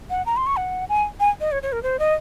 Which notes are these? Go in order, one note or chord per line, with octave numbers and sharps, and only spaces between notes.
F#5
A#5
C6
C#6
F#5
G#5
G#5
D#5
C#5
C#5
A#4
C5
D#5